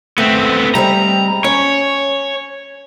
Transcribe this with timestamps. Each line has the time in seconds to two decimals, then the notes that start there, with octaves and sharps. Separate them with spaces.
0.18 A3 B3 C4
0.75 G3 G#3 C4 A#5
1.44 C#4 C#5